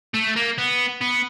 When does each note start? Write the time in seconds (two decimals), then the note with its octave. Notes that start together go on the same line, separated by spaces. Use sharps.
0.14 A3
0.36 A#3
0.58 B3
1.01 B3